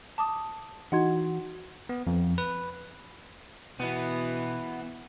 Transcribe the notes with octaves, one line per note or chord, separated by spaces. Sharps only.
A5 D6 D#6
E3 D#4 F#4 F#5 C6 G#6
B3
F2
B4
B2 E3 B3